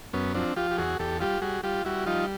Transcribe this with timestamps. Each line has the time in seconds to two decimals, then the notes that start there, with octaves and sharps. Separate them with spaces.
0.13 F#2 B3 C#4
0.34 F3 C4 D4
0.56 F3 F4 G4
0.71 G4
0.78 E2 F#4 G#4
0.99 E2 G4 A4
1.20 G3 F4 G4
1.42 G3 F#4 G#4
1.63 G3 F4 G4
1.85 G3 E4 F#4
2.06 F3 D#4 F4